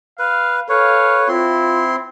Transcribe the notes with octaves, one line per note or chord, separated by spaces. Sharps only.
B4 F5
A4 B4 C#5 F5
C4 E4 F4 C6